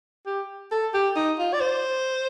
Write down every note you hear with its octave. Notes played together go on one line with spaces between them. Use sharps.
G4
A4
G4
D#4
F4
D5
C5